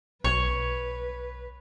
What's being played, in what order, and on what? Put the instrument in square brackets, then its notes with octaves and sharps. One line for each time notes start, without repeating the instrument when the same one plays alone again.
[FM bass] B1 [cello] B4 [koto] C#5